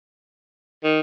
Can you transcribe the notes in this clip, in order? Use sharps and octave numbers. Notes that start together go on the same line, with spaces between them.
D#3